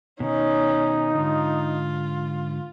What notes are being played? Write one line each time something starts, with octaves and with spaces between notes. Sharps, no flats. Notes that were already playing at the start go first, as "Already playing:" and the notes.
B2 D#3 C#4 D#4
G#2 D3 F4